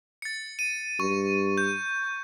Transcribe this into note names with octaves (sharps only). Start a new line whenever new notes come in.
A6 C#7
D#7
G2 C#6
G6